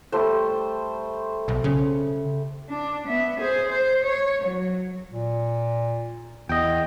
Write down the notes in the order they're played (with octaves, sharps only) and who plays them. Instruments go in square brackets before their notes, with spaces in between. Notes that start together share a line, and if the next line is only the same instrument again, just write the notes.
[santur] G3 A3 C5
[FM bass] B1
C#3
[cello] D4
B3 E5
G#4 C5
C5
C#5
F#3
[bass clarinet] A#2
[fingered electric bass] E2 [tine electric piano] D#5 G5